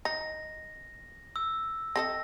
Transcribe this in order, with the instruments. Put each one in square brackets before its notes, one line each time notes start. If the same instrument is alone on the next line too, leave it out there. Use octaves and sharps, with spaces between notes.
[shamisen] D#4 [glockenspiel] A#6
[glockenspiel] E6
[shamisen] C4 A4 D#5 [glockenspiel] A#6